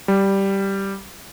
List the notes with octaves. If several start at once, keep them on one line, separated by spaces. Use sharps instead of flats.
G3